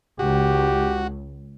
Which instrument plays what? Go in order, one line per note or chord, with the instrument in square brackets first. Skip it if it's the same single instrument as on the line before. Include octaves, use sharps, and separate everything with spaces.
[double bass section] C#2 [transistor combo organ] F#4 [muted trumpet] G4